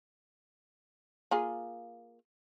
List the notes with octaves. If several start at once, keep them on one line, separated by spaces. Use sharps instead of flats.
A#3 F4 G#4